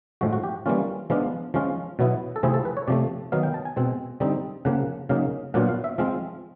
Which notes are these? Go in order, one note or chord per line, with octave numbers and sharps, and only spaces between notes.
A2 F3 G#3 F#4
F#4
G4
E3 G3 A#3 C#4 F4
F3 G#3 B3 D4 F4
F3 G#3 C#4 F4
B2 F#3 B3 E4
A4
C3 F3 A3 C4 E4 G#4
A4
B4
C#5
C3 F3 A3 D5
D#3 F#3 B3 D#4 F5
G5
A5
G#5
B2 G#3 C4
D3 G3 C4 D#4
C#3 F3 A#3 F#5
C#3 F#3 A#3 D#4 F5
A#2 F#3 B3 D4 F4 F#5
F5
E5
F3 G#3 C4 F4 F5